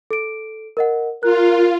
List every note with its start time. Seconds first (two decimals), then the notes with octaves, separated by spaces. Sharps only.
0.11 A4 D7
0.77 A#4 D#5 F#5
1.23 F4 A#4 F#6